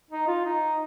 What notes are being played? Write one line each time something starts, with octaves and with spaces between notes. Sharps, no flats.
D#4
F4
D#4